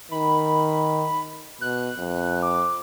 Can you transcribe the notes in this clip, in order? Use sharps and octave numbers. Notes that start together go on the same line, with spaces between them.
D#3 B5
B2 F#6
F2
D6